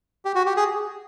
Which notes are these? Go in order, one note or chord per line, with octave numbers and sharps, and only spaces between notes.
G4
F#4
G4
G#4